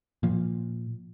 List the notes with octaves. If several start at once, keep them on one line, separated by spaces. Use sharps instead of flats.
A#2 F3